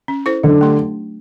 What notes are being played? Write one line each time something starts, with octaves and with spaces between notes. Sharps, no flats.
C#4
E4 A4 C5
D3 F#3
A3 D4 G4